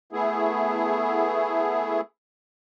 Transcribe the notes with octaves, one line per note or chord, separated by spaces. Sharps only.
A3 B3 E4 G#4